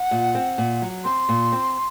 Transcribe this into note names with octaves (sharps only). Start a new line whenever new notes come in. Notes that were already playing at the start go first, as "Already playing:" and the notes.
Already playing: F#5
A#2
C4
A#2
F#3
C4 C6
A#2
C4